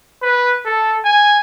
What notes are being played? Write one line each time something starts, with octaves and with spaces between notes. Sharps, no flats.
B4
A4
G#5